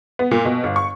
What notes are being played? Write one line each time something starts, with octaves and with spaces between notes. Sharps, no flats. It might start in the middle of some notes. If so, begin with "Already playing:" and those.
B3
A#2
B2
G1
C#6